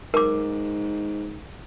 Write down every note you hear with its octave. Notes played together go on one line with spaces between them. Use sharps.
G#2 A#4 D6